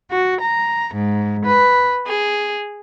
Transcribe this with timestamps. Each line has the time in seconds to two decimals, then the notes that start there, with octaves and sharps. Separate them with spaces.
0.10 F#4
0.41 A#5
0.94 G#2
1.45 B4
2.06 G#4